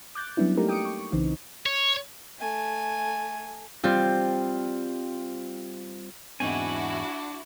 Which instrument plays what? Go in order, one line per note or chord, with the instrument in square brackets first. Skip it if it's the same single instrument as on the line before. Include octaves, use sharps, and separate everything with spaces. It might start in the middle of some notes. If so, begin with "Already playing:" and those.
[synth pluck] D6 F#6 G6 A6
F#3 G3 B3 C#4 D4 E4
A3 A#3 D#4 G4 A#4
G5 D6 D#6 C#7 D7
C#6
B1 C#3 E3 C4 D#4
[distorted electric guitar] C#5
[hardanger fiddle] A3 G#5
[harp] G3 C4 F4
[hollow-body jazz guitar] E2 G#2 C4 [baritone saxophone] D4 [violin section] E4 F#4 [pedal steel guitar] G#5